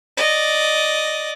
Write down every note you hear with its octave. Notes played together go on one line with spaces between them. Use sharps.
D5 D#5